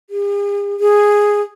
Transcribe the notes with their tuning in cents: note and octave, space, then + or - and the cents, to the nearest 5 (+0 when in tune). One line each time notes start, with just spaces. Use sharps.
G#4 -45
G#4 -5